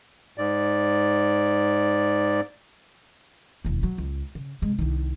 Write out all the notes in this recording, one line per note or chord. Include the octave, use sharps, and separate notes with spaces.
G#2 D5
E1 D#2
F#3
C#2
C#3
C3 G#3
C2 D#3